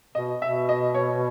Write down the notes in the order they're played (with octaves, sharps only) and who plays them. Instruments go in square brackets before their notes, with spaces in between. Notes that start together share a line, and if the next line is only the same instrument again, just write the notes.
[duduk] B2 [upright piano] D#5
[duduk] B2 [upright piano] E5
[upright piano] D#5
C#5